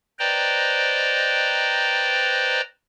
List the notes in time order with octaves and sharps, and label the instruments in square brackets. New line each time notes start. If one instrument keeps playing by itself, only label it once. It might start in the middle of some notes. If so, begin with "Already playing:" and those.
[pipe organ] B4 C5 D5 D#5 G5 A#5